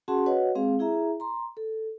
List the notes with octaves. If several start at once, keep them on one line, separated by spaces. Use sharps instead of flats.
C#4 F#4 G#4 F#5 A5 C6
F#4 B4 C#5 D#5 F#5
G#3 C4 G#4 F5
E4 G#4 E5 A#5
A#5 C6
A4